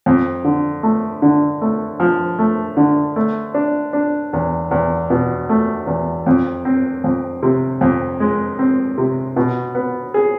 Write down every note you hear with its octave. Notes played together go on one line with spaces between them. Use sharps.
F2
D3
A3
D3
A3
F3
A3
D3
A3
D4
D4
E2
E2
B2
A3
E2
F2
C4
F2
C3
F2
G#3
C4
C3
B2
B3
G#4